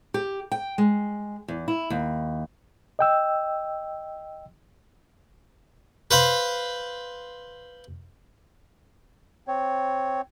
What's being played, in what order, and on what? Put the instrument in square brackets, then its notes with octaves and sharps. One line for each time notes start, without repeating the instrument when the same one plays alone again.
[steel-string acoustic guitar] G4
G5
G#3
E2
E4
D#2
[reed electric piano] D#5 G5 E6
[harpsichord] B4 C5 F5 B5
[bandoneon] C4 C#5